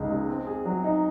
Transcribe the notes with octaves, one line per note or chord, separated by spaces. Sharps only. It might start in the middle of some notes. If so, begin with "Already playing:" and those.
Already playing: C#2 C#3 D#4
G#3
C4
G#4
F#3
D#4